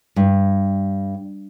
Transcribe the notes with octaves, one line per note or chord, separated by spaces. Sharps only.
G2